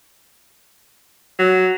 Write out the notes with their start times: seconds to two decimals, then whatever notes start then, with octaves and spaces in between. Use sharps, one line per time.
1.39 F#3